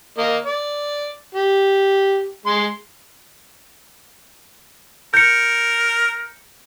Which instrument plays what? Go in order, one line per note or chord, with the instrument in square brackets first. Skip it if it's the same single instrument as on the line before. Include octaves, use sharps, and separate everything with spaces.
[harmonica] A#3 D#5
D5
G4
G#3 C6
[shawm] A#4 [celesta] G6 C#7